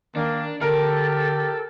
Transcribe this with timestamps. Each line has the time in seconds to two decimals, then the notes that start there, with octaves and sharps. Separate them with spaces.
0.16 D#3 A#3 D4
0.61 D3 G4 A4 A#4